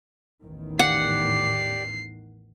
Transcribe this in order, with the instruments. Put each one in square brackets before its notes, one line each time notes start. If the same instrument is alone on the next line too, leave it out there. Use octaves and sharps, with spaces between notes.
[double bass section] A1 E2 D#3
[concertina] G4 D5 [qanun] F#5 [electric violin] C7